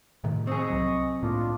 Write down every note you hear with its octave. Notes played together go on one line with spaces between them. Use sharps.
A2 C3 D#3
C4 G#4 D#5 C#6
C2 F#3
A2 A#3 D4 F4